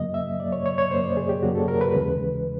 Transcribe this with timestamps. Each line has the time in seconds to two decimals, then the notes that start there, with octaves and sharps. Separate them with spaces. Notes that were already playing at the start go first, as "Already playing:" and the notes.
Already playing: F#2 C#3 F#3 A#3 D#5
0.14 E5
0.40 F#2 C#3 F#3 A#3 D5
0.52 C#5
0.66 C#5
0.78 C#5
0.91 F#2 C#3 F#3 A#3 C5
1.04 D5
1.17 G#4
1.29 G4
1.42 F#2 C#3 F#3 A#3 F#4
1.55 A4
1.68 A#4
1.81 B4
1.94 D#2 C#3 E3 G#3